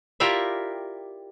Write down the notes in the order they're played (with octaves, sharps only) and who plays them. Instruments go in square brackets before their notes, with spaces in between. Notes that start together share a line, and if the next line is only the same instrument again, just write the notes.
[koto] E4 F4 G4 A#4 D5 E5